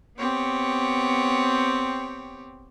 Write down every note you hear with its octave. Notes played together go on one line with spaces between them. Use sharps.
B3 C4 G4 C#5